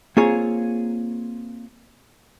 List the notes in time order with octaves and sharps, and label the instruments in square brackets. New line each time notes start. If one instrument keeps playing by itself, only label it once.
[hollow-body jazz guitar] A#3 C4 F4 G#4 C#5